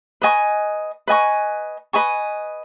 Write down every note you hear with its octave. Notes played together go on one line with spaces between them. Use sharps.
B4 D#5 G#5 C#6
B4 D#5 G#5 C#6
B4 D#5 G#5 C#6